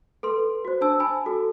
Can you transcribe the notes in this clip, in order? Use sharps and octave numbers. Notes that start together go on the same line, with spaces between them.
A4 B4 C6
F#4 C5
D4 C5 A5 E6
G#5 A5 B5
F#4 A4